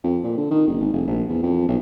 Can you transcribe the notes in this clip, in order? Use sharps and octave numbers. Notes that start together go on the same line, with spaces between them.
F2
A#2
D3
D#3
F#1
G#1
F1
A#1
E2
F2
B1